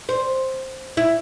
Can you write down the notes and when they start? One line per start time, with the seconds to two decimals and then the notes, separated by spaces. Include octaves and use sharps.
0.09 C5
0.97 E4